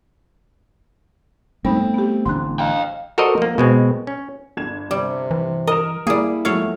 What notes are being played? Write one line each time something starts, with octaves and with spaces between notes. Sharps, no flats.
G3 A3 B3 C4 D#4
B3 G4
A1 D3 D4 C6 F#6
F5 G5
F#4 A4 A#4 C5 D5 D#5
F3 A#3
B2 G#3 C4
C#4
G1 G#6 E7
C3 G3
E3
A#4 D#5 E7
G3 A#3 E4 G#4
F3 F#3 G#3 A3 C#5 F5